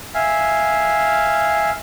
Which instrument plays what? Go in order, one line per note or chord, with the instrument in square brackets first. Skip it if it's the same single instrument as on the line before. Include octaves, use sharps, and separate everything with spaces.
[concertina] E5 F5 G#5